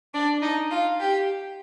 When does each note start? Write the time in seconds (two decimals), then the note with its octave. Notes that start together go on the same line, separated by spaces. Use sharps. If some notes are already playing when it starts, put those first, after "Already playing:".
0.14 D4 D5
0.42 D#4 D#5
0.71 F4 F5
1.00 G4 G5